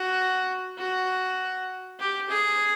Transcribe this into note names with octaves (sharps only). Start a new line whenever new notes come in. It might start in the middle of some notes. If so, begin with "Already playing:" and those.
Already playing: F#4
F#4
G4
G#4